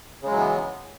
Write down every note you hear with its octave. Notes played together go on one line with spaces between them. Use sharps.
C#3 E3 F#3 G#3 B3